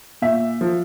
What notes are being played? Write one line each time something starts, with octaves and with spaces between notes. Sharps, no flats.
A#2 E5
F3